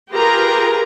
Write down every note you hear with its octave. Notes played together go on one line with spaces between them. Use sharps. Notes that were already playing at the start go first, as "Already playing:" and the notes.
F4 G4 G#4 A#4 B4 A#5